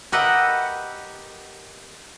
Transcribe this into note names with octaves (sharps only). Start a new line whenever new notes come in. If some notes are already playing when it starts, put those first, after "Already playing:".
G4 A#4 B4 D#5 E5 F#5